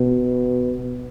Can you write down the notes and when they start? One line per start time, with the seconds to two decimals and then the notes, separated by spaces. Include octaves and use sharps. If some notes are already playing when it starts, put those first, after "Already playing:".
Already playing: B2